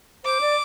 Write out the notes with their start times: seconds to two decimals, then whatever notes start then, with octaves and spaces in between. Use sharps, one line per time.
0.24 C5 D6
0.41 D5